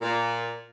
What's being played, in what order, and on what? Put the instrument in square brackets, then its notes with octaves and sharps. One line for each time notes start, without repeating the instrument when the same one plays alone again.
[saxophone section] A#2